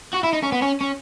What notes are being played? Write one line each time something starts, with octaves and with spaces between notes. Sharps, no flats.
F#4
E4
D#4
C#4
B3
C#4
C#4